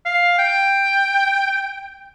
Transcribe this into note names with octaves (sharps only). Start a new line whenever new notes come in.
F5
G5